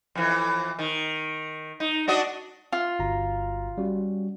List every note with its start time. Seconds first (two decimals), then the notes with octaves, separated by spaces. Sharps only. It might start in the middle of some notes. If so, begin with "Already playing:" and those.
0.15 F2 E3
0.79 D#3
1.80 D#4
2.08 D4 F#4 D#5
2.73 F4
2.99 G1 F#4 A#5
3.78 G3 C#4 F#4